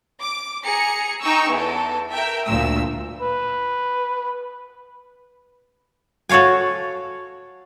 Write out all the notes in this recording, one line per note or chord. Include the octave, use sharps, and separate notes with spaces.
D6
G#4 A#5 C#7
D#4 G5 C#6 E6
E2 A4
A#4 E5 G5
D2 A#2 E6
B4
F#4 A4 C#5 F5 G#5